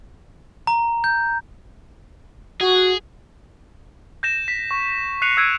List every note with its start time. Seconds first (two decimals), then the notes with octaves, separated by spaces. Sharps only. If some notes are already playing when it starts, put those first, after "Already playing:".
0.67 A#5
1.04 G6
2.61 F#4 G#4
4.23 G6 A#6 E7
4.48 B6
4.71 C#6
5.22 F#6 C7 C#7 D#7 F7
5.37 E6 F#6 G#6 D7 D#7